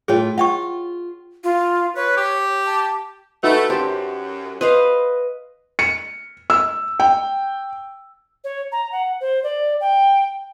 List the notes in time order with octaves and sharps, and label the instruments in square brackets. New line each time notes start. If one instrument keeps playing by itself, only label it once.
[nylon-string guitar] A2 F4 G5 [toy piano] G#4 C#5
[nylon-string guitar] F4 [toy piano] F#5 G5 C#6
[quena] F4
[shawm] B4 [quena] C#5
[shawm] G4
[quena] A5
[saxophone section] A3 [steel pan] D#4 F#4 B4
[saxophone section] F#2 [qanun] G4 [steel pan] C5 A5
[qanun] B4 D#5 F5 [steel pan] C5
[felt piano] C#7
E6
G5
[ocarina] C#5
A#5
F#5
C5
D5
G5